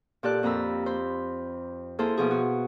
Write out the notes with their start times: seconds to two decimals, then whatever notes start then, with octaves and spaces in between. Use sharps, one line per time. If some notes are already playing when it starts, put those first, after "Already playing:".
0.23 A#2 G4 A4 D5 F#6
0.43 F2 A#3 A#5 B5 E6
0.86 C5 B5
1.99 A#3 E4 G#4 A4 C5
2.17 B2 F3 G#4
2.31 F#4